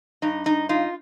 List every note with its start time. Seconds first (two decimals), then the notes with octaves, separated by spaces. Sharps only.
0.22 G2 D#4
0.46 D#4
0.69 D#4 F4